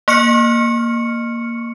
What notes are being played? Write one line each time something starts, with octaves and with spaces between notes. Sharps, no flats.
A#3 C#6 F6 C#7